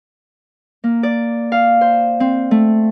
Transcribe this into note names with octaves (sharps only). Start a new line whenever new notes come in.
A#3
D5
F5
C5
C4
A3